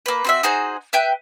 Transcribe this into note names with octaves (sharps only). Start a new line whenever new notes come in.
A#3 B4
C4 F#4 E5
D#4 F#4 G#4 C5
B4 E5 G5 F#6